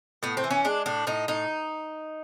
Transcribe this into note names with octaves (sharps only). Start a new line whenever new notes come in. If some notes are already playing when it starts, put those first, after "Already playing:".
A2 B3
C4
E3
C#4
G#3 D4
A2 D4
A2 D#4
A2 D#4